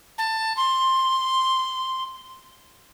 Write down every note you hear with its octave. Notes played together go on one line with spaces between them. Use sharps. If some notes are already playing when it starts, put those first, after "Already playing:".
A5
C6